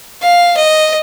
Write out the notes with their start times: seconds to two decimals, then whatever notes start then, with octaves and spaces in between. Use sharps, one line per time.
0.22 F5
0.57 D#5